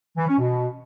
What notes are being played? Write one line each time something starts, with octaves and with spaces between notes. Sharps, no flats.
E3
C#4
B2